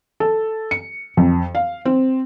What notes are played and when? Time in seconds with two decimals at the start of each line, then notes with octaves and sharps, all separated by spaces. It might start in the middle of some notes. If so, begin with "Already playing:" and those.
0.20 A4
0.71 C#7
1.17 F2
1.55 F5
1.85 C4